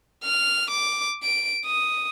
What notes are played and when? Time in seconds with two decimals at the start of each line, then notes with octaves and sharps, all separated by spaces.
0.24 F6
0.70 D6
1.23 D7
1.66 D#6